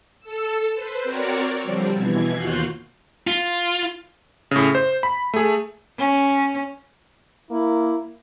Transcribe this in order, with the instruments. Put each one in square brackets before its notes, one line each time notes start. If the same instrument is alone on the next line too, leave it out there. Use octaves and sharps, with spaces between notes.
[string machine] A4 E6
B4 C5
C4 F#4 A#4 C#5 D5
D3 F3 G3 C4
B2 E3 G#6
D#2 F4 F#4 F5 F#6 G6
[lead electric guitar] F4
[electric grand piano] A2 C#3
C5
B5
A3 G#4
[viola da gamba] C#4
[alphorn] A#3 [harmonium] E4